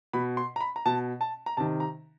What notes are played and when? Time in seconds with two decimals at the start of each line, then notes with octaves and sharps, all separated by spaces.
0.13 B2 B5
0.37 C6
0.56 A#5
0.60 B5
0.76 A#5
0.85 B2 A5
1.21 A5
1.46 A#5
1.57 C3 D#3 A5
1.80 A#5